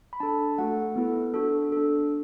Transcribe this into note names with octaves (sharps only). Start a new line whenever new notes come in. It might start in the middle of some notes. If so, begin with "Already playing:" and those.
B5
D4 A4 A5
A3 F#4 A4 F#5
B3 E4 A4
D4 F#4 A4
D4 A4